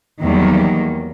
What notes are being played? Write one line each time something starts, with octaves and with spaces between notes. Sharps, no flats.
E2 D#3 F#3 G3 A#3